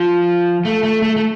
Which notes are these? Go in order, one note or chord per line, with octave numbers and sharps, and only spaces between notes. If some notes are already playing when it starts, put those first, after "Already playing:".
Already playing: F3
A3
A3
A3
A3